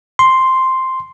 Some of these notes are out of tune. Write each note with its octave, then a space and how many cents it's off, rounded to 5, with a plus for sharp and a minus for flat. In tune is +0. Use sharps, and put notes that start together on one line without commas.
C6 +0